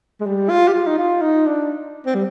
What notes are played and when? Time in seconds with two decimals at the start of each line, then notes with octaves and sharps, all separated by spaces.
0.21 G#3
0.26 G3
0.50 F4
0.68 G4
0.74 F4
0.87 D#4
0.98 F4
1.22 D#4
1.46 D4
2.06 C4
2.15 G3